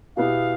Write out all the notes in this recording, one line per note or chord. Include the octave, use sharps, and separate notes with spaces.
B2 B3 E4 G4 F5